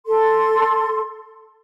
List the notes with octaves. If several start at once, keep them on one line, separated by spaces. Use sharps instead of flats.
A4 C6